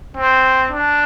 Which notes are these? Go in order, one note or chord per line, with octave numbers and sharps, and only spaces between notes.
C4
D4